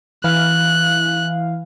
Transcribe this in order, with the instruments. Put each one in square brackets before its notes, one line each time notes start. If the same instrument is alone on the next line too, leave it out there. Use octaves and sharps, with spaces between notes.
[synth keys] E3 F5 [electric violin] F#6